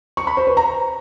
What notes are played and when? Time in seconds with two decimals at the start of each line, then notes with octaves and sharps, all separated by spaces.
0.17 C#6
0.27 B5
0.37 C5
0.47 B4
0.57 A#5